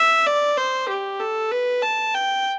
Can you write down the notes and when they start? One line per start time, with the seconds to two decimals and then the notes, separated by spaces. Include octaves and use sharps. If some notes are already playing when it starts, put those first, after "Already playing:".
Already playing: E5
0.26 D5
0.57 C5
0.89 G4
1.20 A4
1.51 B4
1.82 A5
2.14 G5